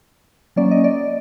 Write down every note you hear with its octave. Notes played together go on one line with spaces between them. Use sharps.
F#3 A#3 C#4 D5
D#5
D5